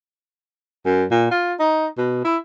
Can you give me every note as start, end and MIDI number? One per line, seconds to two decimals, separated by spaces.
0.86 1.06 42
1.11 1.26 46
1.31 1.54 65
1.60 1.87 63
1.98 2.21 47
2.25 2.37 64